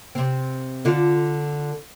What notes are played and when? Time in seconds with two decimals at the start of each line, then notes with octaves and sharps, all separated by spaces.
0.15 C3 C4
0.85 D3 D4 F4